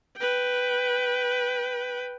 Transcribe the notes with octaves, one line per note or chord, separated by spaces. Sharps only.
B4 G5